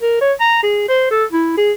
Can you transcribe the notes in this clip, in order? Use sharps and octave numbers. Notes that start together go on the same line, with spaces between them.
A#4
C#5
A#5
G#4
C5
A4
E4
G#4